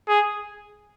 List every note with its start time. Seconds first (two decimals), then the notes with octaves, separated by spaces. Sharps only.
0.08 G#4